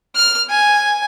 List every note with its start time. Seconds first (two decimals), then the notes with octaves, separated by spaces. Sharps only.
0.15 F6
0.50 G#5